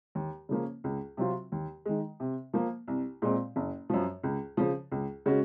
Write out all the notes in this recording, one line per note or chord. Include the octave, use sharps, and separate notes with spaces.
D#2
C#3 F3 A#3 C#4
C#2
C3 F#3 C4 F4
D#2
D#3 G#3
C3
F3 A#3
C2
A#2 G#3 C4
F#1
F#2 F3
C#2
C#3 F3
C#2
C#3 G#3 C#4 F#4